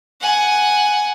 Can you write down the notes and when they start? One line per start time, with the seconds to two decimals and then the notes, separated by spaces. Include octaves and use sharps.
0.21 F#5 G#5